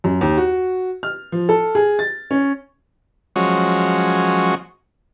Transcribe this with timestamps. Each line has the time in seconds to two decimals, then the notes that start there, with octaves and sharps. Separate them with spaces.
0.04 F#2
0.21 D#2
0.37 F#4
1.03 F6
1.32 F3
1.49 A4
1.75 G#4
1.99 A6
2.31 C#4
3.36 F3 F#3 G#3 C#4 F#4